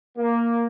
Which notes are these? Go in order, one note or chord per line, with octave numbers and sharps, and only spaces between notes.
A#3